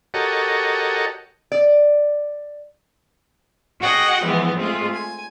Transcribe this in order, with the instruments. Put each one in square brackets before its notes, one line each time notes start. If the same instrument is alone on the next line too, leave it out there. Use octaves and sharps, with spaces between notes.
[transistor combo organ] F#4 G4 A4 A#4 C#5 D#5
[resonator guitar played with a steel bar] D5
[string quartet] F#4 G#4 D#5 F#5 G5
E3 F3 G#3 B3
G#3 A3 C4 F4
G#5